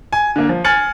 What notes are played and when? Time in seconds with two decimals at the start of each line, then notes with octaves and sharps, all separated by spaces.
0.13 G#5
0.36 D3 A#3
0.49 F3
0.64 G#5 F6 A6 C#7 F#7